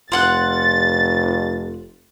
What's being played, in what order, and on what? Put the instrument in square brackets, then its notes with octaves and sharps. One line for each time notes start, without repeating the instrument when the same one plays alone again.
[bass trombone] F1 [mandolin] F4 F#5 F#6 [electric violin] A6